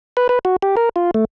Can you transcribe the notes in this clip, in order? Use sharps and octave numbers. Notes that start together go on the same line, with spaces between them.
B4
B4
F#4
G4
A#4
F4
A3